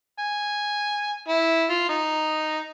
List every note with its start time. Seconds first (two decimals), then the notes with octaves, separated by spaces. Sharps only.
0.19 G#5
1.28 E4
1.70 F4
1.89 D#4